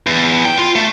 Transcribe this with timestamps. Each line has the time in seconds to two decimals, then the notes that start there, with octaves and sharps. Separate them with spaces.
0.07 E2
0.45 G5
0.58 F4
0.75 A3